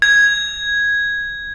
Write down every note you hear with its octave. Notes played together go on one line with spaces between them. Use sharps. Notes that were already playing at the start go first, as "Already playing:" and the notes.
G#6